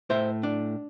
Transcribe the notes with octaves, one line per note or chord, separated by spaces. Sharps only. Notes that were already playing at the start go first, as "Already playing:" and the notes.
A2 C5 E5
D4